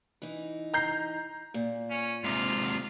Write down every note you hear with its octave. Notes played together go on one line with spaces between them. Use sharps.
E3 D#4
A#5 G6 C7
A#2
C#4
G#2 C3 F4